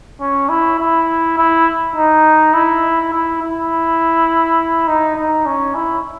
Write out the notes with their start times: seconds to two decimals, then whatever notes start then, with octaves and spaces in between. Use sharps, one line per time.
0.21 C#4
0.49 E4
0.79 E4
1.38 E4
1.96 D#4
2.54 E4
3.13 E4
3.42 E4
4.88 D#4
5.16 D#4
5.46 C#4
5.75 E4